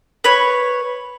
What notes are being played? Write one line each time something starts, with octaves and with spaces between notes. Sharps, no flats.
B4 C#5